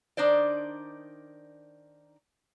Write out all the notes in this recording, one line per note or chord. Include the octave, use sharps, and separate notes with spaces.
D#3 D4 D#4 C5 D5